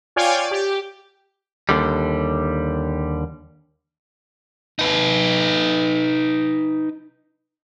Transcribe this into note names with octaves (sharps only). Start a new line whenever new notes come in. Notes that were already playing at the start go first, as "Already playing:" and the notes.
F4 C#5 D5 F5 G5 G#5
D5
G4
D#2 D3 G3
D#4 B4